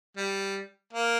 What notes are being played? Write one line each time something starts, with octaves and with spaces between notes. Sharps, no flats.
G3
A#3